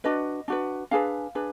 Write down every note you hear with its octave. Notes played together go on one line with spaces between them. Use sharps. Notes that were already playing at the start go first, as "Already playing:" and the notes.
D4 F#4 B4 D#5
D4 F#4 B4
D4 G#4 B4 F5
D4 G#4 B4